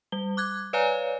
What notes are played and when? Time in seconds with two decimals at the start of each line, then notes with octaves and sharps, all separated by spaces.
0.12 G3 G7
0.37 D6 F#6 G#6
0.73 B4 C#5 D5 F5 G#5 A#5